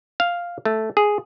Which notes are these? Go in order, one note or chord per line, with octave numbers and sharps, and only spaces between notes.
F5
A3
G#4